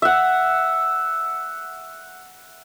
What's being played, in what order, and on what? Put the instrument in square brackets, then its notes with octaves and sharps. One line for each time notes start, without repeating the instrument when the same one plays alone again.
[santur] E5 F#5